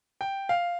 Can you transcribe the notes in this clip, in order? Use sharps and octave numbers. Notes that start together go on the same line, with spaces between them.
G5
F5